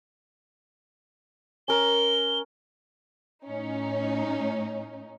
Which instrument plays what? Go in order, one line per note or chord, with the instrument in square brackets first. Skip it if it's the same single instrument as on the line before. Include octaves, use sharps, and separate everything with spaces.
[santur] C#4 A#4 [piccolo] G7
[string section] A2 C#4 D#4